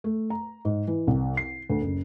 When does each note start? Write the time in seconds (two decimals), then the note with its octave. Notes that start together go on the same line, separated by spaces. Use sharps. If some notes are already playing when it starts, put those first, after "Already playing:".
0.04 A3
0.30 A#5
0.65 G#2
0.88 E3
1.07 C2
1.37 C7
1.70 D2
1.82 F#1